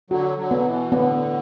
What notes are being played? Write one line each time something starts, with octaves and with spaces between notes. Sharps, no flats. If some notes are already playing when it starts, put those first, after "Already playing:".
D3 F#3 F#4
D3 F#3
B3
B2 E3
A2 D3 B3